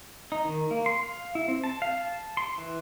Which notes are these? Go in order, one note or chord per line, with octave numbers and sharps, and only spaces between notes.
D#4
D#3
A#3
C6
F5
E4
C4
A5
F5
A5
C6
E3